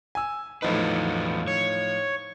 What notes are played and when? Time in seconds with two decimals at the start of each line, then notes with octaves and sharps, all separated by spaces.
0.15 G#5 E6
0.62 E2 A2 F3 F#3 D#4 B4
1.48 C#5